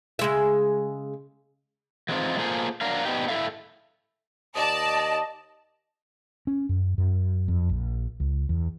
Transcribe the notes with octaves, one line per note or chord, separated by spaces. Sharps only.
C#3 G#3 E5
E3 F#3 G#3 C4 D#4 F4
A#3 F4 G#4 A4 C5
F#3 D4 A#4 F5
B3 D4 D#4 G4
E4 A4 E5 F5
D#2 D5 D#5 A5
C#4
F#2
F#2
F2
A#1
C#2
E2